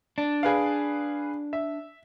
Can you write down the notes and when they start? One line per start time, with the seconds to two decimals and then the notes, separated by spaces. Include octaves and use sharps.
0.18 D4
0.43 G#4 B4 F5
1.53 E5